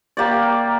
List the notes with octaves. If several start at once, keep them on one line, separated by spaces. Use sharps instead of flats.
A#3 G4 D5